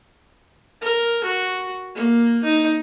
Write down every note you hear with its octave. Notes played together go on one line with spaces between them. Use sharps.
A#4
F#4
A#3
D#4